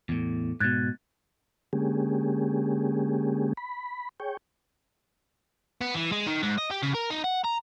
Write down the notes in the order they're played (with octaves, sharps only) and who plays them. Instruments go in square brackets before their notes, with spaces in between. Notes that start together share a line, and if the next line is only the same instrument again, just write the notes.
[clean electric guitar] E2 A2
[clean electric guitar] G#2 B2 [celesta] F#6 G#6 A6
[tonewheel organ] D3 G#3 A#3 C#4 G4 G#4
B5
G#4 C#5 G5
[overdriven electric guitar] B3
E3
G#3
D#3
G#2
D#5
G4
C#3
A#4
D#4
F#5
A#5